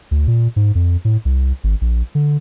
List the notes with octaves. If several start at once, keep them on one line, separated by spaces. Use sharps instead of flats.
D2
A#2
G#2
F2
A2
C2
G#1
A#1
D3